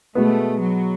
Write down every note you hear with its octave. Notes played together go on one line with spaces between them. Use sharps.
B2 G#3 A3 B3
F#3